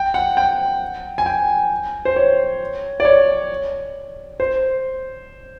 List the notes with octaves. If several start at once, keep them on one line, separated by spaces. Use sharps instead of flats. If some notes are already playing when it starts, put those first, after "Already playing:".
Already playing: G5
F#5
G5
G#5
G5
C5
C#5
D5
C#5
C5